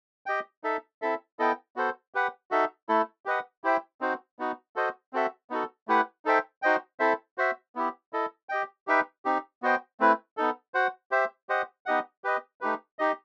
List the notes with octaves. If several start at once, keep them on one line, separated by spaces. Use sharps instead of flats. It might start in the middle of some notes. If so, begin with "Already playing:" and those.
G4 D#5 G5
D#4 A4 E5
C4 E4 A4 E5
B3 E4 A4 D#5 G5
B3 F#4 A4 C5
G4 B4 F#5
D#4 F#4 A4 E5
A3 E4 A4
G4 B4 D#5 F#5
E4 G4 C5 E5 G5
C4 D#4 F#4 C5
B3 D#4 F#4
F#4 A4 C5 D#5
C4 F#4 A4 E5
B3 D#4 F#4 A4
A3 E4 G4 B4 F#5
D#4 A4 C5 E5 G5
D#4 F#4 C5 D#5 G5
C4 E4 A4 C5 E5
F#4 C5 E5
B3 E4 G4
E4 A4 D#5
G4 D#5 G5
D#4 G4 B4 E5 G5
C4 D#4 G4
B3 F#4 C5 D#5 G5
A3 C4 E4 B4
B3 D#4 A4
F#4 C5 F#5
G4 C5 E5
G4 C5 D#5 F#5
B3 D#4 G4 D#5 F#5
G4 B4 D#5
A3 D#4 G4 B4
D#4 G4 D#5